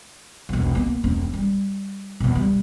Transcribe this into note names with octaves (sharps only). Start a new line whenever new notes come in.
E1 B1
A#3 B3
E1 C#4
G3
E2 B2
G3